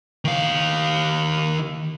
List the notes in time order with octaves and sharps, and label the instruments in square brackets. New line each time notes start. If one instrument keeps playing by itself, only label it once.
[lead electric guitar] D#3 F5